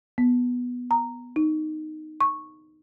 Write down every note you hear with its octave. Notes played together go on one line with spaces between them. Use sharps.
B3
A#5
D#4
C#6